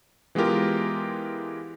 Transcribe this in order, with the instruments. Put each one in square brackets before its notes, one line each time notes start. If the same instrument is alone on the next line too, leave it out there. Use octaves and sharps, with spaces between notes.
[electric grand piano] E3 G#3 B3 F4 G4 A#4